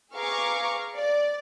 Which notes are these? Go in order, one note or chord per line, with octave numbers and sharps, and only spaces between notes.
G#4 B4 F5 A#5 C#6 D6
D5